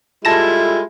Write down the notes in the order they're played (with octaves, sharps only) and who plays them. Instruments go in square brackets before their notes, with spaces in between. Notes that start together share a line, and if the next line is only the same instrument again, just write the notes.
[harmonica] G3 G#3 E4 [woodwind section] F4 A4 [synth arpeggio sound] A5 A#6 E7